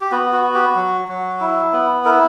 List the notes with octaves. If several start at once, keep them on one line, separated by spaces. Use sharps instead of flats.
G4
B3 F#4
F#4
F#4
G4
F#3
F#3
E4
B3
E4 A#4